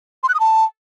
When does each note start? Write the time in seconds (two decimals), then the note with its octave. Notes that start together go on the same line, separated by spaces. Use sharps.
0.23 C6
0.29 F#6
0.34 D#6
0.40 A5